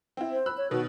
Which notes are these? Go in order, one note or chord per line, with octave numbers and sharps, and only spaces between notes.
C4 E4
C5
B5 E6 F#6
C#5
B2 D#3 B3 F#4